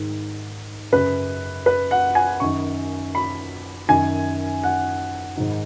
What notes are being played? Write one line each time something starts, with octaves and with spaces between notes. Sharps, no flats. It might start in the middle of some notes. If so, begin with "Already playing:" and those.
Already playing: G#2 D#3
F#2 C#3 B4
B4
F#5
G#5
F#2 D#3 C#6
B5
F#2 D#3 G#5
F#5
G#2 D#3